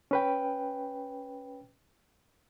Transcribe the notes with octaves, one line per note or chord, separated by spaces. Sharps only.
C#4 B4 G5